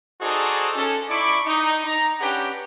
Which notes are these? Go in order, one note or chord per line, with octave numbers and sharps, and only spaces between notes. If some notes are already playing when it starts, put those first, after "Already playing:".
D#4 F#4 G#4 A4 C5 D5
C#4 A4
D#4 E4 D5 B5 C#6 D6
D#4
A#5
C#4 D4 G4 B4 F#5 G5